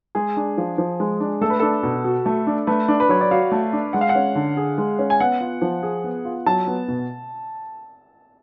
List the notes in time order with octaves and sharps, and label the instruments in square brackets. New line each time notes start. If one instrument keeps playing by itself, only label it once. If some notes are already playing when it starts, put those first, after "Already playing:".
[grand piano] G#3 [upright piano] G#4
[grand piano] D4
F3
F3
G#3
D4
[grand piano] A3 [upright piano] A4
[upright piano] B4
[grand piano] D4 [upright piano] A4
[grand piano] B2
F#4
A3
D4
[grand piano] A3 [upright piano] B4
[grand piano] D4
[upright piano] B4
[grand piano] F#3 [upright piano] C#5
[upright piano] D5
[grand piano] F#4 [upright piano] F5
[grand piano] A3
D4
[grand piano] G#3 [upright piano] F#5
[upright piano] F5
F#5
[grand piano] C#4
D3
G#4
G#3
C#4
[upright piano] G#5
[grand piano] B3 [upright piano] F#5
[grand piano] F4
F3
G#4
B3
F4
[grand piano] F#3 [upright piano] A5
[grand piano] B3
B2